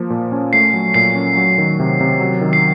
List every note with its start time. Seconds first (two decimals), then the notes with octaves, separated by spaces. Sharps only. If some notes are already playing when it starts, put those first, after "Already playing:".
Already playing: F3 A#3
0.10 A#2
0.32 C#4
0.53 A3 C7
0.73 F#3
0.94 A#2 C7
1.15 C#4
1.37 F#3
1.58 D#3
1.80 C3
2.01 C3
2.20 F#3
2.41 D#3
2.53 C7